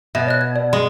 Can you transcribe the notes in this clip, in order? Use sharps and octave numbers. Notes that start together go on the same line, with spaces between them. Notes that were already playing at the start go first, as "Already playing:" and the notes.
B2 E5
C#5 D#5 F#6
G#6
D5
G#3